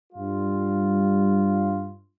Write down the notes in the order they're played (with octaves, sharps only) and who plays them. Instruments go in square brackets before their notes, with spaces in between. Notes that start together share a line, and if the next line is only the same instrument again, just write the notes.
[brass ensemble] G2 G3 F4